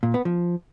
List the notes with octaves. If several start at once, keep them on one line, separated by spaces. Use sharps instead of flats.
A#2
B3
F3